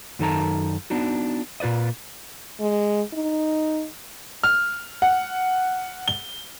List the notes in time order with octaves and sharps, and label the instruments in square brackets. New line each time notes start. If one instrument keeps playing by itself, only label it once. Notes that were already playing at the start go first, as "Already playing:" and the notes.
[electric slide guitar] F#2 D#3 D#4 A4 A5 A#5
B3 D4 D#4 F#4
A#2 F4 B4 D5 D#5
[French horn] G#3
D#4
[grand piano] F6
F#5
G7